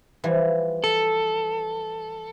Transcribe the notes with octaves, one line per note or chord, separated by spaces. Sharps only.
E3 F3 G3
A4